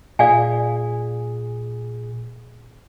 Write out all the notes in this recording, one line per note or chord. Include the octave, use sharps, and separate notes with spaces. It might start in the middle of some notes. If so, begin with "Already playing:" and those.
A#2 G#4 D5 F5 G#5